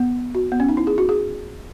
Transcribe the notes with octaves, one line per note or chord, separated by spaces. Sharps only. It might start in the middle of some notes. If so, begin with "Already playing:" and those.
Already playing: B3
F#4
B3
C#4
D#4
E4
G#4
F#4
G#4